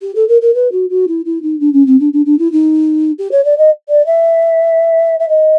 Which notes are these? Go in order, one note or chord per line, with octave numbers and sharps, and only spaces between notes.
G4
A4
A#4
A#4
B4
F#4
F#4
E4
E4
D#4
D4
C#4
C4
D4
D4
D4
E4
D#4
G4
C#5
D5
D#5
D5
E5
E5
D#5